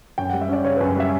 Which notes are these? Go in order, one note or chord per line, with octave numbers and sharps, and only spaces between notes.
F#2 G5
G3 F#5
E5
C#4 D5
C#3 C#5
F#2 B4
G3 E5